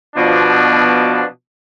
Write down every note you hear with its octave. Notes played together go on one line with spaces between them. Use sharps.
B2 F3 D4